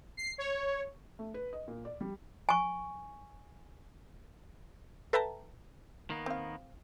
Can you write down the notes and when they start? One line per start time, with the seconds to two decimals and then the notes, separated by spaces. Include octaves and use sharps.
0.17 C7
0.38 C#5
1.19 A3
1.34 B4
1.53 D#5
1.68 A#2
1.85 D5
2.01 G3
2.49 G#5 C#6
5.13 A4 B4 E5 G5 A5 A#5
6.10 D#3 A#3 B3
6.26 C4 F5